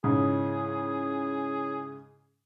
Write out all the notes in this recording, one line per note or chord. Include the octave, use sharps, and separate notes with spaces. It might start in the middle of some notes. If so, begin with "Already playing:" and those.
G#2 C#3 E4 G#4 C#5 D#6